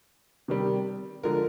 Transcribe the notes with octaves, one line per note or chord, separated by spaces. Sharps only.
C3 D#3 G3
D3 F3 G#3 A#4